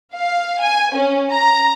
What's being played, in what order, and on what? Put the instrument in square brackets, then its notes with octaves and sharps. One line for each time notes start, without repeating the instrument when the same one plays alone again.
[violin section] F5
G#5
C#4
A#5